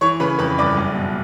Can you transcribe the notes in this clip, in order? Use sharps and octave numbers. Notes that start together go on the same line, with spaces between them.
E3 C#5 C#6
C#3 B4 B5
F2 B4 B5
G1 D5 D6
F#1
B2